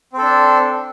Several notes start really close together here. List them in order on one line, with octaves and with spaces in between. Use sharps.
C4 A4 D4